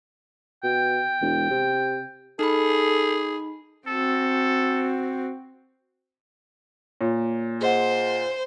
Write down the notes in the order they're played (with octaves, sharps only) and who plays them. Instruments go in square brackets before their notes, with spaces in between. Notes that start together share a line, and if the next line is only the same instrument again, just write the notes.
[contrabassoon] B2 [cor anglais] G5
[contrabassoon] E1
C3
[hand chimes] D#4 B5 [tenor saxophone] G#4 [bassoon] A4
[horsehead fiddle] C4 F#4 [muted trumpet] A4
[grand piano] A#2 [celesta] C#5
[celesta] G#4 D#5 F#5 [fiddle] C5